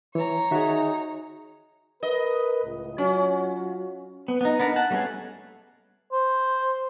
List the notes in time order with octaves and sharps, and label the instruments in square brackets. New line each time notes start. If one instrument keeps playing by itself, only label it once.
[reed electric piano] E3 [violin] C#5 A#5
[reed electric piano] D#3 F#4 [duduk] D#4 [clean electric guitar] G#4 E5
[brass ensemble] A#4 B4 [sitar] D#5
[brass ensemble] C#2 A2
[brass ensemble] F#3 F4 F#4 [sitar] C#4
[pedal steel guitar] B3
B3 D#4
B3 D4 A#4
F#5 A5
G3 A3 B3 C#4 G#4
[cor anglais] C5